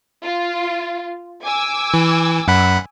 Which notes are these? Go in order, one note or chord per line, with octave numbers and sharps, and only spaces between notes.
F4
G#5 D6 E6
E3
F#2 F#5 B5